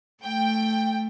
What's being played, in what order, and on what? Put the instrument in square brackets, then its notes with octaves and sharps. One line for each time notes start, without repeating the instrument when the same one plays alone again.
[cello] A3 [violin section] G5